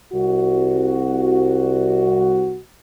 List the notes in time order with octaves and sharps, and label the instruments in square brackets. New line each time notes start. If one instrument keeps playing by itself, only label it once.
[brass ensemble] C2 F#4